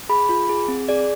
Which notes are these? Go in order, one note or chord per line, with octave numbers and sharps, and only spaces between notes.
G#4 B5
F4
G#4
C4
G#4 D5